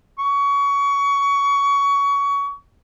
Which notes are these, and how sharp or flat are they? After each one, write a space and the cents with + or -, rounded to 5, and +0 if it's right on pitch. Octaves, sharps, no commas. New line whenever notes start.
C#6 +25